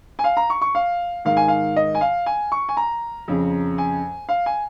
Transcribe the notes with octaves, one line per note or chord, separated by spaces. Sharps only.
G#5
F5
A#5
C#6
C#6
F5
G#2 D#3 F5
G#5
F5
D#5
G#5
F5
G#5
C#6
G#5
A#5
F2 C#3
G#5
F5
G#5